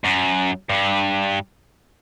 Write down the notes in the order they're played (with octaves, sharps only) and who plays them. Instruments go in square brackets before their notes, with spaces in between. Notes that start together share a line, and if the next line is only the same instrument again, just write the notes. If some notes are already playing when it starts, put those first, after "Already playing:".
[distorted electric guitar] F#2
G2